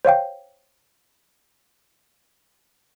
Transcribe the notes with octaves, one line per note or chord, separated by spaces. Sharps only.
C5 C#5 F5 G5